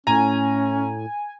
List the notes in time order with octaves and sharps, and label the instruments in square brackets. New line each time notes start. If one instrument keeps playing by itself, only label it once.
[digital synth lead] A2 [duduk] C#4 [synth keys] G#5 [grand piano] A#5